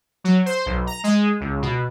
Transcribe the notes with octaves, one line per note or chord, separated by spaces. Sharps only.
F#3
C5
B1
A#5
G#3
C#2
B2